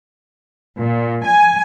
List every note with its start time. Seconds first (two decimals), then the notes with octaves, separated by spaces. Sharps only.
0.79 A#2
1.25 G#5